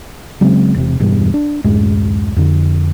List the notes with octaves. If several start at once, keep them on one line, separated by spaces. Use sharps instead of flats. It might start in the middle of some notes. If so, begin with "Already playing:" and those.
C#3 F#3 G#3 C4
E1 C3
E1 E2 G2 B2
D4
D1 F#2 A2 G#3
F2 D3